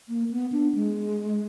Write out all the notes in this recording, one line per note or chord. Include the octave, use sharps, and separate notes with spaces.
A#3
B3
D4
G#3